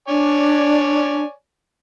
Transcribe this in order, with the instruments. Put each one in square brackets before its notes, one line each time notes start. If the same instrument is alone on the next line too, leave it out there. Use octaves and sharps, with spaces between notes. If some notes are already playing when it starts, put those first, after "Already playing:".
[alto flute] D4 [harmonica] C#5 D5 G#5